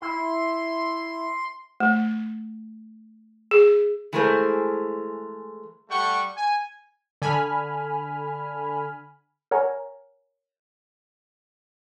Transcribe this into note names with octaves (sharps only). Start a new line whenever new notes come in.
E4 C6
A3
G#4
E3 G#3 A3 G#4 A#4 C5
G3 A3 G4 F#5 G5 C#6
G#5
D3 G#5 B5 F6
A#4 C#5 F#5 G#5 A#5